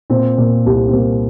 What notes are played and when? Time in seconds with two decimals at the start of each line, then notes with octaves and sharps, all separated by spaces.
0.10 A#2 C4
0.38 A#2 A#3
0.66 C2
0.88 C4
0.93 C2 A#3